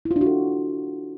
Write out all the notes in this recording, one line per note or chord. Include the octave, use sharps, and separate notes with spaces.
E4
F4
D4
F#4
A4